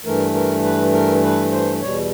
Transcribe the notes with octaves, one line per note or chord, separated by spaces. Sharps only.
G2 E3 A3 A#4
A#4
B4
A#4
B4
C5
E2 B2 G3 C#5